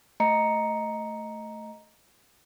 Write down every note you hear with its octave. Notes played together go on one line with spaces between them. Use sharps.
A3 D#5 A#5 C#7